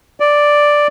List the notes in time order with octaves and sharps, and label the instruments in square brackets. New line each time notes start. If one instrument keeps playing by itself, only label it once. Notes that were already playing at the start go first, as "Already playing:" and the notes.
[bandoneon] D5